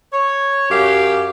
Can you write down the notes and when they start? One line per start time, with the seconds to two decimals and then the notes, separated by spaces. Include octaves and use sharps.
0.12 C#5
0.70 F#2 G4 F5